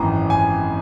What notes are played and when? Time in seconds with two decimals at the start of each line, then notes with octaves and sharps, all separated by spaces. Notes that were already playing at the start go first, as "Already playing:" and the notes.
Already playing: G#1 F#2 E3 A#5
0.30 G#5